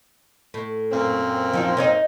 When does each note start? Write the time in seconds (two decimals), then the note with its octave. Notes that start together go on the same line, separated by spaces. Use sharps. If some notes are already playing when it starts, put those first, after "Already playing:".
0.54 A2
0.91 F#2 A#2 C4
1.53 F3 D#4 F4
1.77 D#4 C#5 D#5